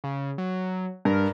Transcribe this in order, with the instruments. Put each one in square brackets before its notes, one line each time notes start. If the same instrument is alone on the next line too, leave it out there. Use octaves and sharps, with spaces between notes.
[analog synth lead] C#3
F#3
[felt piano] G2 [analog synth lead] A#4